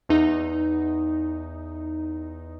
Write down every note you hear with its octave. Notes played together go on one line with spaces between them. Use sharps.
E2 D#4